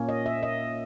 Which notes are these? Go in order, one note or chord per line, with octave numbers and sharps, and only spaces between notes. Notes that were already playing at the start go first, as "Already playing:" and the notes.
Already playing: A#2 A#3 C#4
D#5
E5
D#5